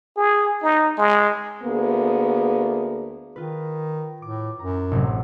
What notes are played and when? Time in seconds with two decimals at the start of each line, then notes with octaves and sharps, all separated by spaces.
0.17 G#4
0.63 D#4
0.98 G#3
1.64 D2 A#3 B3 G#4
3.36 D#3 F4 B4
4.22 A2 D6
4.59 F#2 A#5
4.91 A1 C3 F#3